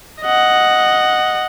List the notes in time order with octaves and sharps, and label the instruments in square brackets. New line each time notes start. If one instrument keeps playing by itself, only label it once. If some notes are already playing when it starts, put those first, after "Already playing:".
[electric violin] D#5 F#5